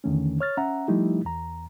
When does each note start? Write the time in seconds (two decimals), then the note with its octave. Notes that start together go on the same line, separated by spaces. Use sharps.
0.04 E2 D3 D#3 A3 C#4
0.40 C#5 F6 A6
0.57 C#4 E5 F#5 A#5
0.88 F3 G3 A3 D#4 E4 G4
1.25 E2 A#5